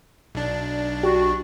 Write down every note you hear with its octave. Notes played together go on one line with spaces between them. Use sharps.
B1 D4
F#4 G4